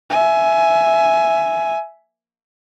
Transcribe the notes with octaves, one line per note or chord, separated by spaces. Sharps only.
E5 G#5